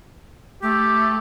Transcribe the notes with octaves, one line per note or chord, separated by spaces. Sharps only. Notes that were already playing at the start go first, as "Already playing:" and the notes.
A3 G4